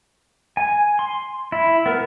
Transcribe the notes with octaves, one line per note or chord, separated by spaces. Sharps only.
G#5
C6
E4
B3 A#4